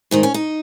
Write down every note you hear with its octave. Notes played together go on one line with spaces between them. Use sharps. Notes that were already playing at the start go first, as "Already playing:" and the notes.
G#2 D#3 D#4
C#4
D#4